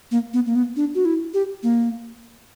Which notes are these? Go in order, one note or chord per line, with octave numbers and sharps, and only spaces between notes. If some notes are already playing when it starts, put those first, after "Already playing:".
A#3
B3
A#3
B3
D4
F#4
E4
G4
A#3